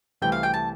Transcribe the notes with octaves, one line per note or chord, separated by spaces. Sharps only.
C2 C3 E3 A3 C4 G5
F5
G5
A5